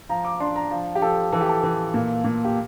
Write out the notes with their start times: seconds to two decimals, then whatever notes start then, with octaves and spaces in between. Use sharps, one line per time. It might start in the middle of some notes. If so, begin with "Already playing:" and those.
0.09 F3 A#5
0.25 D6
0.40 D4 C6
0.56 A#5
0.71 F3
0.95 G4
1.01 F3 A4
1.32 E3 A4
1.41 G4
1.49 A4
1.63 E3
1.94 A#2
2.24 A#2
2.45 G4